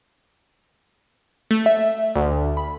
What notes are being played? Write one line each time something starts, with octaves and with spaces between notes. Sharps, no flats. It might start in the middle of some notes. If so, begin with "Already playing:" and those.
A3
E5
D2
B5